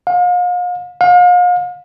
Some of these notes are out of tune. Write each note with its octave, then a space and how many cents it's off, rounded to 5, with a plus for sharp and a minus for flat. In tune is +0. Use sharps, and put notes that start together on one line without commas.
F5 +40
F5 +40